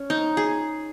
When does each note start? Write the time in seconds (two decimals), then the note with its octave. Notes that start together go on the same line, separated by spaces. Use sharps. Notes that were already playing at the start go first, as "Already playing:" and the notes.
Already playing: C#4
0.10 D#4
0.37 G#4